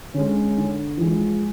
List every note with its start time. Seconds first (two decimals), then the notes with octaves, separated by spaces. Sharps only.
0.14 D3 G#3 C#4
0.57 D3
0.97 E3 F3 G#3